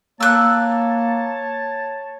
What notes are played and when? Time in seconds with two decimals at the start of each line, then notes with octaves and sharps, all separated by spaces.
0.20 A#3 C#5 A5 E6 F#6